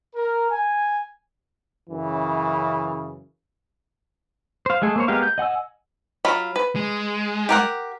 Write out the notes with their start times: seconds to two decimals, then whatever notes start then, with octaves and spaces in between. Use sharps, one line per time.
0.16 A#4
0.50 G#5
1.89 F#2 C#3 E3
4.66 C5 F5
4.82 G#3 A3 G#4 A4
4.96 A#3 C5 C#5
5.08 G#3 B3 G4 A#4 F5
5.23 G6
5.38 D#5 F#5 G#5 E6
6.25 F#3 F4 B5
6.56 B4
6.76 G#3
7.49 G4 A#4 F#5